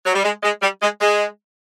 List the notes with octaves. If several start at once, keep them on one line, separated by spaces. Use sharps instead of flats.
F#3
G3
G#3
G#3
G3
G#3
G#3